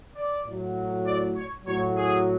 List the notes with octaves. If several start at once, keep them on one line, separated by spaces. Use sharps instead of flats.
D5
A2 F#3
D5
C#5
A2 F#3 C#5
G#4